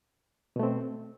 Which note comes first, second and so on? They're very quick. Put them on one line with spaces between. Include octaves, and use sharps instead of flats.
B2 A3 C4